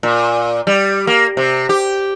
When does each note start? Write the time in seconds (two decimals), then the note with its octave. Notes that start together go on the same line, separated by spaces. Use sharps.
0.03 A#2
0.67 G3
1.07 A#3
1.37 C3
1.69 G4